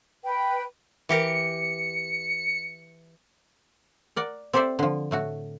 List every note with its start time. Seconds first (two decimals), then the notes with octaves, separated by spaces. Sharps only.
0.24 B4 G5
1.09 E3 G4 A#4 C#7
4.16 A#4 D5 F#5
4.53 C4 G4 A4 C5 D5 E5
4.79 D3 F3
5.11 A2 A3 F#4